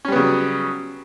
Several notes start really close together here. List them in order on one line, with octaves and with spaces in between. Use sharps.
C#4 G3 B3 C#3 F#3